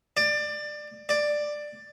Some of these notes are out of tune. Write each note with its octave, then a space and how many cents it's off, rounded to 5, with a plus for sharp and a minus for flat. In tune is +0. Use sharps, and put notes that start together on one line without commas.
D5 +20
D5 +10